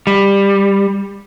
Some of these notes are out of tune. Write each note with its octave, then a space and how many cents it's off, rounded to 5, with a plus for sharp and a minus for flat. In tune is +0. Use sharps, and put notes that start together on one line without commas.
G3 +15